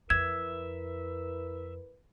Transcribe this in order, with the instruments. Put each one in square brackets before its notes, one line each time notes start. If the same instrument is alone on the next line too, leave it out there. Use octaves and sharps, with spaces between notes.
[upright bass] F2 [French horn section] E4 A#4 B4 [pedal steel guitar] E5 [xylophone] G#6